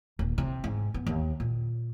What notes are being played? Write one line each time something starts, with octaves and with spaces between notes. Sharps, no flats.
D#1
C3
G#2
B3
D#2
A#2